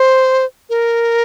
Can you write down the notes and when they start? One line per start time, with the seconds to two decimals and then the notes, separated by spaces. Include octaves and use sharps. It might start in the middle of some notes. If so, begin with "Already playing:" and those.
Already playing: C5
0.70 A#4